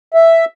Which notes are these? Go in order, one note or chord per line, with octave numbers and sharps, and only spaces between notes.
E5